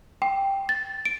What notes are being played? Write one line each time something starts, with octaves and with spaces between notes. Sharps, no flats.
G5
A6
D7